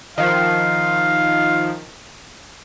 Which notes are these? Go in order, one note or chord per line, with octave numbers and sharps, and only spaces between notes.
D#3 F3 F5